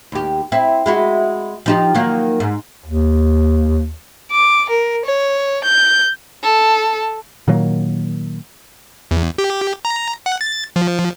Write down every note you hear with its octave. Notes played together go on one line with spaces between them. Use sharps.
D#2 G4
C4 E4
G#3 E4 F#4
F3 D#4 G4
D#3 F#3 A#3
G#2
D#2
D6
A#4
C#5
G6
A4
A#2 D#3 F#3 A#3
E2
G4
A#5
F#5
A6
F3